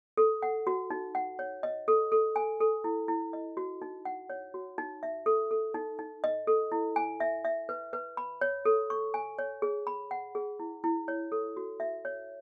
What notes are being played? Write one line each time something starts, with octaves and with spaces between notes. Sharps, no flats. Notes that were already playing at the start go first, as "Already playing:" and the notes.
A4
F#5
F#4
D#4
F#5
C#5
D#5
A4
A4
G#5
A4
E4
E4
D#5
F#4
D#4
F#5
C#5
F#4
D#4
E5
A4
A4
D#4
D#4
D#5
A4
E4
G#5
E5
E5
B4
B4
B5
C#5
A4
C#6
G#5
C#5
G#4
B5
F#5
G#4
E4
E4
C#5
A4
F#4
E5
C#5